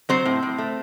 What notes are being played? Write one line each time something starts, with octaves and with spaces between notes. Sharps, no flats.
F#3 C4 C5
A2
A2
A3